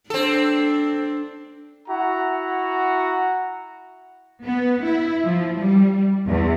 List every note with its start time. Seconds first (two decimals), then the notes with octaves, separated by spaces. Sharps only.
0.10 C4 D4 A4
1.89 E4 F#4 F#5 A#5
4.44 B3
4.84 E4
5.24 F3
5.57 G3
6.26 E2